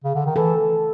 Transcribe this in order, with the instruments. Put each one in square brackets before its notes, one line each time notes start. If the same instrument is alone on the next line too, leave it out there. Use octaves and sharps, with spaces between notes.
[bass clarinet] C#3
D3
D#3
[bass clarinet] E3 [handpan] A4